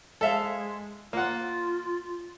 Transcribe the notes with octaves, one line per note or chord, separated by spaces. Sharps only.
G#3 A4 E5 F5
A#3 F4 F#5